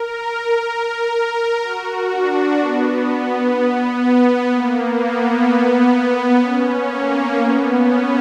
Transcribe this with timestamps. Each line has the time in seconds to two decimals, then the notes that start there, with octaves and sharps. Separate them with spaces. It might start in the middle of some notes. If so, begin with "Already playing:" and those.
Already playing: A#4
1.15 A#4
1.62 F#4
2.10 D4
2.58 B3
3.06 B3
4.02 B3
4.50 A#3
4.97 B3
5.45 B3
6.41 C#4
6.89 A#3
7.37 B3
7.84 C#4